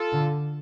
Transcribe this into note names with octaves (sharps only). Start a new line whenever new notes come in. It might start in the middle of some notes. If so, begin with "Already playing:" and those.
Already playing: F4 A4
D3